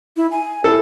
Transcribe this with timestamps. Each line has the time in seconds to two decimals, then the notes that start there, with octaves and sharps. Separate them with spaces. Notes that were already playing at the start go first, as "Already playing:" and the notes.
0.17 E4
0.31 G#5
0.64 E4 A4